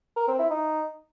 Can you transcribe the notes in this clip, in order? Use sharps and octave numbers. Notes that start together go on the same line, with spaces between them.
A#4
C4
E4
D#4